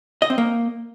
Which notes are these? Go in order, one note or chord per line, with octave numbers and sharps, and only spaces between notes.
D#5
C4
A#3